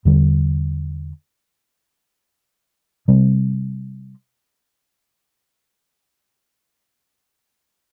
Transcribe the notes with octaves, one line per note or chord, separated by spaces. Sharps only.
E2 D3 G3
C3 G3 C4